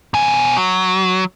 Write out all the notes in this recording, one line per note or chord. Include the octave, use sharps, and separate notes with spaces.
B2 G#5
F#3